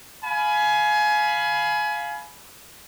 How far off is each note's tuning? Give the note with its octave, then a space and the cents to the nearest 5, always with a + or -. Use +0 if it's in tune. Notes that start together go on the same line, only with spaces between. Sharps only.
F5 +0 G#5 +25 B5 +0